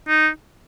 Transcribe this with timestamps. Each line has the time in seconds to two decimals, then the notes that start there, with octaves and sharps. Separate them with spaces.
0.08 D#4